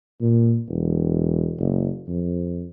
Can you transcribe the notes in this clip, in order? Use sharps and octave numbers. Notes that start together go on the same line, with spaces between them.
A#2
E1
F#1
F2